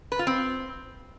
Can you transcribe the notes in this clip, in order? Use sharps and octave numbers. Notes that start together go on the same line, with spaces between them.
B4
F4
C4